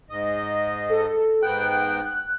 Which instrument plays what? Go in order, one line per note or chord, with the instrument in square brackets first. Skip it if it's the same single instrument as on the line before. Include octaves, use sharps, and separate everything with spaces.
[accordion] G#2 D#5
[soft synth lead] A4
[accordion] G#2 B3 G5 [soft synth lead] F#6